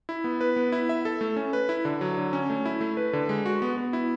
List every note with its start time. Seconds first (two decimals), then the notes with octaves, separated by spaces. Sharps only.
0.09 E4
0.24 B3
0.41 B4
0.56 B3
0.72 E4
0.89 E5
1.05 A4
1.21 A3
1.36 C#4
1.53 B4
1.69 E4
1.85 D3
2.01 F#3
2.18 D3
2.33 C#4
2.50 A3
2.66 E4
2.81 A3
2.97 B4
3.13 D3
3.29 G#3
3.46 F#4
3.62 B3
3.77 B3
3.93 E4